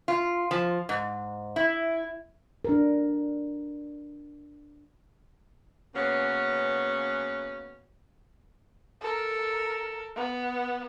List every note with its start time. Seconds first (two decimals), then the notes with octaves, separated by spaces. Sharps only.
0.08 F4
0.51 F3
0.89 G#2
1.56 E4
2.65 D4 A#4
5.95 C#3 A#3 B3 C#4 F#4 B4
9.01 A4 A#4
10.16 B3